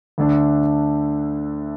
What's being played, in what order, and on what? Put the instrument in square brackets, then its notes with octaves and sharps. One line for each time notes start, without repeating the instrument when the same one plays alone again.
[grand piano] D2 D3 A3 D4